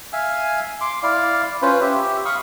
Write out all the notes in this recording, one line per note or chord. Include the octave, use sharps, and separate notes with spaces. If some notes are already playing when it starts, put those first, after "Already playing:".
E5 F5 G#5
C6 D6
E4 D5 F5
C#4 F4 B4 C5
G4 E5
F5 B5 C#6 D#6